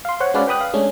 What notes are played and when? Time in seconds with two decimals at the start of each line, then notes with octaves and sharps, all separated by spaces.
0.05 F5 C6
0.20 C5 C#5 F#5
0.34 G#3 C#4 F#4 B4 D5 F5
0.47 B4 G5 B5 D#6 F#6
0.61 F5
0.74 G#3 A3 C#4 D4